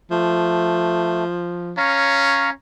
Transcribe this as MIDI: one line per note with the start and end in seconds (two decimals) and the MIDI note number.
0.11 1.74 53
0.11 1.24 57
1.77 2.51 61
1.77 2.50 73
1.77 2.50 77
1.77 2.50 82